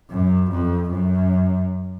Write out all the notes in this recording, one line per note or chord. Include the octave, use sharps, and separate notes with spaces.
F#2
F2
F#2